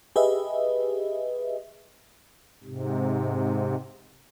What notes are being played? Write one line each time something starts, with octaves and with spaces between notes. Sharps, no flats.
G4 G#4 B4 D#5 E5
G#2 C3